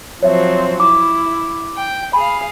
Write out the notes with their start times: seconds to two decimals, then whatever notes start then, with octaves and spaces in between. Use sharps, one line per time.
0.23 F3 F#3 C4 C#5 E5
0.80 E4 D6
1.75 G5
2.13 G#4 F5 B5